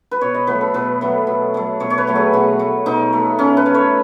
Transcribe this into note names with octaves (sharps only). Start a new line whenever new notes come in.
B4
B2 C#5
D#5
F#3 A3 B4
A4
B2 B4
F#3 A3
B2
F#3 A3
B2 C#5
C#5
B4
F#3 A3
G#4
B2 F#4
A3
B2 D#4
A3
B2 C#4
B4
A3
C#5